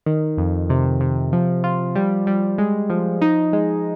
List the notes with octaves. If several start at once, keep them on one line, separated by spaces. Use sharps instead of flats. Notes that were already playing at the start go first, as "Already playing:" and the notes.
D#3
F2
C3
C3
F3
F4
G3
G3
G#3
F3
D#4
G#3